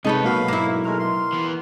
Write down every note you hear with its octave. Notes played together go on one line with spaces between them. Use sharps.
C2 C3 G#3 D#4 A4 B4 C#5
B1 A#3 F#4 F5 B5 C#6
G#2 A#3 E4
G#3 A3 A#4 F6
C6
E3 B3